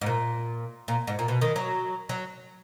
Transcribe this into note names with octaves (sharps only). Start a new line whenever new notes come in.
G#2
A#2
A#2
G#2
A#2
B2
D#3
F#3
F#3